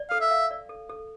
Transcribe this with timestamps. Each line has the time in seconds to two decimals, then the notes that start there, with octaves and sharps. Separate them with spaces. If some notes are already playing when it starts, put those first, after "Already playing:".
Already playing: D5
0.10 A4 F5
0.21 E5
0.31 F5
0.51 D5
0.69 A4
0.90 A4